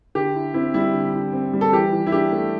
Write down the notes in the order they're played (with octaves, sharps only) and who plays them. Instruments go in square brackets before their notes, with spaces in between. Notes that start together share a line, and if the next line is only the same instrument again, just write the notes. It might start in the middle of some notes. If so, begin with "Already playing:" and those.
[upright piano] D3 G4
E4
C4 E4
G3 E4
D3
E4
C4
G3
A4
E3 G4
E3
E4
D4 G4
A3